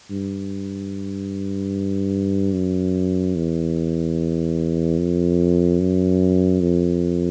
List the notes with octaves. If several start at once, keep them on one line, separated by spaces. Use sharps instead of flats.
G2
F#2
E2
F2
F#2
F2